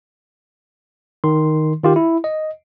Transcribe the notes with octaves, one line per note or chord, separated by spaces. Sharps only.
D#3 C6
D#3 F4 G4
E4
D#5